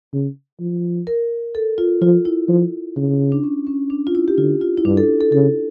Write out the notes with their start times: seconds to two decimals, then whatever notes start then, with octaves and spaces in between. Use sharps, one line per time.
0.13 C#3
0.60 F3
1.07 A#4
1.55 A4
1.78 F4
2.01 F3 F4
2.25 E4
2.49 F3
2.96 C#3
3.32 D4
3.44 C#4
3.67 C#4
3.90 D4
4.07 F4
4.15 E4
4.28 G4
4.38 D3 F4
4.61 F4
4.77 E4
4.85 G2 D4
4.97 A4
5.21 A4
5.32 C#3 A4